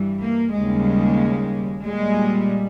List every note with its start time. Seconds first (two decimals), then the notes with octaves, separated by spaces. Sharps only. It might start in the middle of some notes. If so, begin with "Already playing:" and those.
Already playing: G2 E3 G3
0.23 A#3
0.56 D#2 C#3 G3 G#3
1.86 A#2 G3 G#3